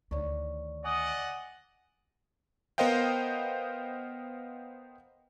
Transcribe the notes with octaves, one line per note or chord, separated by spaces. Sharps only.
D2 D#3 C#5 D5 C#6
D5 D#5 F#5 G#5 D#6
B3 A#4 C5 D#5 F5 G5